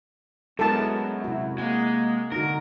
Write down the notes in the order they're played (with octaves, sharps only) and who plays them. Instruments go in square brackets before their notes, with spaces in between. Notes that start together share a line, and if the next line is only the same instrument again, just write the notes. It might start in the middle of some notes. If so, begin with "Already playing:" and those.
[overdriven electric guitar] F#2 [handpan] G#3 E4 A#4 [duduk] B3 [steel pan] A4 A5
[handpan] C3 F#4 [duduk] E4
[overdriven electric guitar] G#3 [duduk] A#3 [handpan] F#5
[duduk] D3 [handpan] D#4 F#4 [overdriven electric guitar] A#4